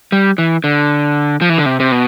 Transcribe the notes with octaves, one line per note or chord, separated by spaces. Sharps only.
G3
E3
D3
F3
E3
D3
C3
C3
B2